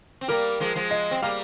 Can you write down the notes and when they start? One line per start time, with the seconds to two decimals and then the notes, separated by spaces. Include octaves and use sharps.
0.21 C4
0.28 G3 A#3 A#4
0.60 F3 G#3
0.75 F3 G#3
0.91 D#5
1.11 C4
1.22 G3 A#3 F5